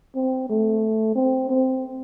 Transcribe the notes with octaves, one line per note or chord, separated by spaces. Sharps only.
C4
A3
C4
C4